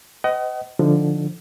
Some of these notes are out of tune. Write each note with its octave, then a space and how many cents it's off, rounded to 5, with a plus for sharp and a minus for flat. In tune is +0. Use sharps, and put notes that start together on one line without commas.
C5 -45 D#5 +10 F#5 +40
D3 +0 F3 +0 D#4 +10